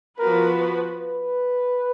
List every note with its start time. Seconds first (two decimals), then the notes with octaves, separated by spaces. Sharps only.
0.19 F3 B3 F#4 A#4 B4
1.00 B4